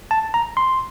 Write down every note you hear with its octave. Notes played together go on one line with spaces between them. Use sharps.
A5
A#5
C6